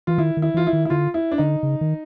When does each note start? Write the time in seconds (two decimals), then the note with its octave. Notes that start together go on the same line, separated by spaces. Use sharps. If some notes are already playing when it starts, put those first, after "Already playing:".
0.07 E3 F4
0.18 D#3 E4
0.37 D#3
0.42 E4
0.54 E3 F4
0.67 E4
0.73 D#3
0.85 E4
0.90 D3 F4
1.14 E4
1.32 D4
1.38 D3 D#4
1.63 C#3
1.81 D#3